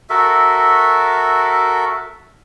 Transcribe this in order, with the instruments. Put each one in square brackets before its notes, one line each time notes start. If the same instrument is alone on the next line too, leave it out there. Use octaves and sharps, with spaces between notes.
[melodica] F#4 A4 A#4 E5